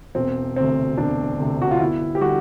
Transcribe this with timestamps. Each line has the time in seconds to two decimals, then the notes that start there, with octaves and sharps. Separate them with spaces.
0.15 E1 C4
0.56 D2 C3 C4
0.97 E1 D4
1.39 D2 C3
1.62 F#4
1.71 F4
1.80 G1 E4
2.15 G4
2.21 D3 G3 F#4